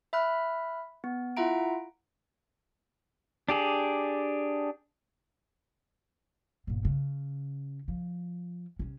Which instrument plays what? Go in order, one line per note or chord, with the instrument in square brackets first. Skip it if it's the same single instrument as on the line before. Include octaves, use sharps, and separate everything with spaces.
[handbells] E5 B5 F6 F#6
B3
E4 F4 E5 F#5 A#5 D7
[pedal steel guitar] D4 G4 G#4
[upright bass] G1 A#2
C#3
F3
C3 C#4